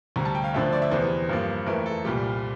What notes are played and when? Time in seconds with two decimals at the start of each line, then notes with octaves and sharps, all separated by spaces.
0.16 D2 C3 G3 A#5
0.25 A5
0.35 G5
0.44 F5
0.53 D2 D3 F3 A3 E5
0.63 C5
0.73 D5
0.82 E5
0.91 E2 C3 E3 C5
1.29 G2 F3 A#3
1.66 F2 E3 A3 A#4
1.86 A4
2.05 C2 A#2 G3 G4